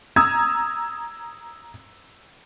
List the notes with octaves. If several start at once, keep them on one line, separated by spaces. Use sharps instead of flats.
A#5 D#6 E6 G#6